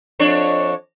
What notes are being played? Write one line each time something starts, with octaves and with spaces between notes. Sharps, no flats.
F2 D4 C#5